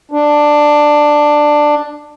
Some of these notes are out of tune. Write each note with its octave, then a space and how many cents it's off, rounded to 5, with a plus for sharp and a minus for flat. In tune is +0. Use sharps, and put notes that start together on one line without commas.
D4 +10